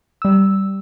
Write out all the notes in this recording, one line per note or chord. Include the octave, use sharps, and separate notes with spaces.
G3 E6